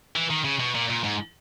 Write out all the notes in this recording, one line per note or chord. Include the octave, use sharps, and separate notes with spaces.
E3
D#3
C#3
B2
A#2
A#2
G#2